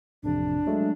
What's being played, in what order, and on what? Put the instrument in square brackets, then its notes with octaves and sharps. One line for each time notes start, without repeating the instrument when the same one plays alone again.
[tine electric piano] A1 F2 C3 [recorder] D4
[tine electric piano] F#3 G#3 A3